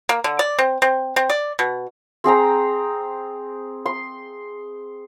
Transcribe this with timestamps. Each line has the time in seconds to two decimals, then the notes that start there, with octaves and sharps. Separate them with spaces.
0.09 A#3
0.24 D3
0.39 D5
0.59 C4
0.82 C4
1.16 C4
1.30 D5
1.59 B2
2.24 C4 G#4 G5 A#5
3.86 C6